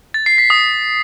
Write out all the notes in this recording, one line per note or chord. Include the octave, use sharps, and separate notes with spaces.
A6
C7
B6
D#6